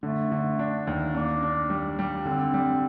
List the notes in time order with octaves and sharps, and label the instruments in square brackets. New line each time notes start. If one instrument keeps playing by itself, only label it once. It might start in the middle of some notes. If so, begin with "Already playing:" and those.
[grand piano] D3 [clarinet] A3
[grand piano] D3
D4
D#2
[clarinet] A#3 [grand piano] D4
[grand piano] D4
G3
G3
[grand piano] D3 [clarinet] C4
[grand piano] G3